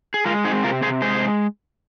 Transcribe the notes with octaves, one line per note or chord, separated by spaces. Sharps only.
G#4
G#3 F4 A#4
C4 D#4 G#4
C3 F4 A#4
C3 G#4 C5
G#3 G#4 C5